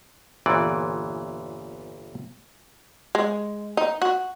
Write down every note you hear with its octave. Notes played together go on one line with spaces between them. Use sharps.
G1 E2 A#2 E3 D5
G#3
D#4
F#4